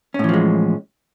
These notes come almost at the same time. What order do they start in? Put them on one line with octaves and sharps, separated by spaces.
C#4 A2 E3 F3 G#3